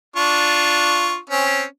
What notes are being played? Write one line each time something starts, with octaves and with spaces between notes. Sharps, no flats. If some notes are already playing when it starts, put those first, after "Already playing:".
D4 F4 C#6
C4 C#4